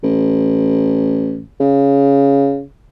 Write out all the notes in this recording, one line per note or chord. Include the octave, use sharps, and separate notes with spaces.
A1
C#3